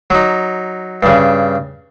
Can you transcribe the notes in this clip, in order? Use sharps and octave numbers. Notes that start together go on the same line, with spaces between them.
F#3 D#4
G2 C#3